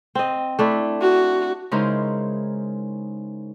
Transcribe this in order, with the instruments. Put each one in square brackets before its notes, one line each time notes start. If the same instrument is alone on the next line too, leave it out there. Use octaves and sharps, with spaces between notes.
[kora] C4 D#5
A3 D4 E4
[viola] F#4
[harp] C#3 G#3 D#4 E4 A#4 C5